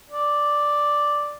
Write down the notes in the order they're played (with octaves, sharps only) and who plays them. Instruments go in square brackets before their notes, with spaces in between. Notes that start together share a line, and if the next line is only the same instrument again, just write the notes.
[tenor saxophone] D5